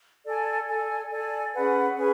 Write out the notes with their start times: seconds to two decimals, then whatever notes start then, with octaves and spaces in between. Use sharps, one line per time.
0.25 A4 D5 G#5
0.68 A4 D5 G#5
1.10 A4 D5 G#5
1.53 C#4 G#4 B4 F#5
1.96 C#4 G#4 B4